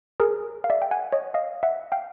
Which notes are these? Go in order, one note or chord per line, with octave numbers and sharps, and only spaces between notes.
G#4 A#4
F5
D5 E5
G5
F#5 G#5
C#5 D#5
D#5 F5
E5 F#5
F5 G5